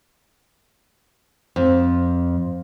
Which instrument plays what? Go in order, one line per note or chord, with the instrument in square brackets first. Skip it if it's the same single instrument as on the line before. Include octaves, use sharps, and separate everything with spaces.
[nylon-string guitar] F2